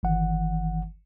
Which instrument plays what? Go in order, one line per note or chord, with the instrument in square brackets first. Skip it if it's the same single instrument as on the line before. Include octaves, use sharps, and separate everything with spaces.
[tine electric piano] G1 D#3 E3 F#5